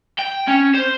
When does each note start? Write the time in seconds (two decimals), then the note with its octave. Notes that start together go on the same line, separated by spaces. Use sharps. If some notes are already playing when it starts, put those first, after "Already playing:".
0.19 G5
0.47 C#4
0.74 C5